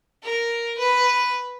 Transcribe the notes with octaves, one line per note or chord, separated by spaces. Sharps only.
A#4
B4